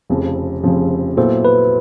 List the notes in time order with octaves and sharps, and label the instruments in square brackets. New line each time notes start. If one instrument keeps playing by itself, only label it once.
[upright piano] F1 F2 C#3 F3
F1 F2 C#3 F3
[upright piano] A#2 F#3 B3 E4 A4 [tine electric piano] C5
[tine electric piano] B4